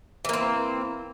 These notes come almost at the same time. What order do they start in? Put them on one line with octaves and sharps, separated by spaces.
E3 A#3 C4